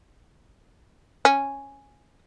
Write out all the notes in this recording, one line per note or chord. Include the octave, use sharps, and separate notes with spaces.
C#4